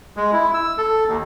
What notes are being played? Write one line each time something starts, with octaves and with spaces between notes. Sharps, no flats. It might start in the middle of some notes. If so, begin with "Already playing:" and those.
G#3
E4
E6
A4
D#2